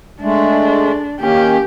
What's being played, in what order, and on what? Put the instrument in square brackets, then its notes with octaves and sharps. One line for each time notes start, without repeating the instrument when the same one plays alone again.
[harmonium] G#3 A3 [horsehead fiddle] D4
[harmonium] D#3 A#3 C#4 [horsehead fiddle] G4